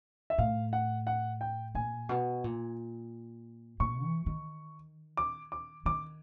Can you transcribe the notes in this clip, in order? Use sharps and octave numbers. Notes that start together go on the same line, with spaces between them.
E5
A2 F5
F#5
F#5
G5
A#2 G#5
B2
A#2
A#2 C#6
E3
D#3
D6
D6
D#3 D6